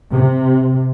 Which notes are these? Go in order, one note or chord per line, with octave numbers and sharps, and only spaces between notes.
C3